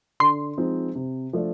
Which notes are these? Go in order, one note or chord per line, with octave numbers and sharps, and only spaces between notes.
D3 C6
F3 G#3 C4 D#4
C3
F3 A3 D4